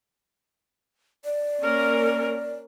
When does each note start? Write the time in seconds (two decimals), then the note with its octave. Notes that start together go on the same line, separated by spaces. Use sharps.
1.25 D5
1.61 A#3 C#4 A#4